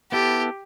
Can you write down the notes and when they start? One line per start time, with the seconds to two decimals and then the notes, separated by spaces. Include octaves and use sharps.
0.12 B3 E4 G4 A4